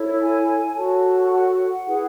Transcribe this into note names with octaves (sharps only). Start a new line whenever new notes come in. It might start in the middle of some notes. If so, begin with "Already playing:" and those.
Already playing: E4 A4 C#5
G#5
F#4 A4 C#5 A5
F#5
E4 G#4 B4